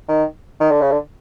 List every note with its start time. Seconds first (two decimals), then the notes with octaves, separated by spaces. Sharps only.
0.08 D#3
0.60 D#3
0.71 D3
0.81 C#3
0.92 D3